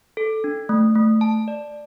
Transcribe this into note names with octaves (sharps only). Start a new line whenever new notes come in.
A4
D4
A3
A3
A5
D5